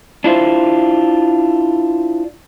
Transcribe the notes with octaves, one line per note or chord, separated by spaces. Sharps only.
D4 E4 F4 C5 E5